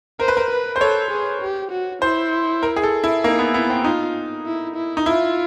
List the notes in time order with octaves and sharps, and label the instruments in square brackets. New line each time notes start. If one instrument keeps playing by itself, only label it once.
[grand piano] A#4 [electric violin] C5
[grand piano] B4
A#4
[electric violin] B4
[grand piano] C5
[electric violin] A4 [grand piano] C#5
[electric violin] G#4
G4
F#4
[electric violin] E4 [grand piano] C5
[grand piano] A#4
G#4
A4
E4
[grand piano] A#3 [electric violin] D#4
[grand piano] B3
[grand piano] B3 [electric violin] E4
[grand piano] C4
[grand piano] D#4 [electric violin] F4
[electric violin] E4
E4
[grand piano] D#4
[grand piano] E4 [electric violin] F4